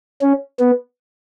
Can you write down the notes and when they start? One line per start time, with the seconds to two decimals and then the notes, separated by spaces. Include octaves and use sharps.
0.22 C#4
0.60 B3